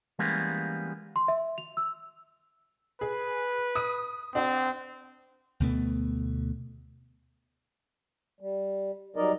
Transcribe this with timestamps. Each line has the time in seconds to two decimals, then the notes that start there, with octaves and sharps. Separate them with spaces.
0.19 E3 G3 G#3 A#3 B3 C#4
1.16 C6
1.28 E5
1.58 F7
1.77 E6
3.01 G#4 B4
3.75 D#6 D#7
4.35 C4 D4 F#4
5.60 D2 B2 A3 B3
8.41 G3
9.16 F#3 G3 D#4 A#4 D5 D#5